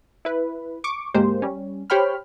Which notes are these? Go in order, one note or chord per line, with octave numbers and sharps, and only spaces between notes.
E4 B4
C#6 D6
G#1 D2 G#3 A#3 G4 C5
G3 C#4
G4 C5 C#5 G5 B5 F6